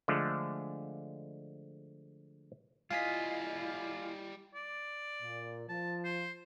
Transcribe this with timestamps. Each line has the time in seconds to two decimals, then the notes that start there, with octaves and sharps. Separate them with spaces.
0.08 D3 F3 G#3 A3
2.91 G3 E4 F4 D#5 F5 G#5 B6
4.55 D5
5.21 A#2
5.69 F3 A5
6.04 C5